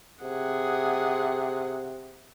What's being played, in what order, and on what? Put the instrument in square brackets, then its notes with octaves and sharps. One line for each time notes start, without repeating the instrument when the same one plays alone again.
[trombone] C3 [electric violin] G#4 F#5